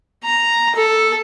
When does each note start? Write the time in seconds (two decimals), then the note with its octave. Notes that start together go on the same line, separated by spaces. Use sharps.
0.24 A#5
0.76 A4